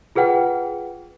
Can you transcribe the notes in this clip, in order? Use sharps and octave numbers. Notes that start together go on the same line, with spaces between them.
F4 G#4 B4 F#5 G5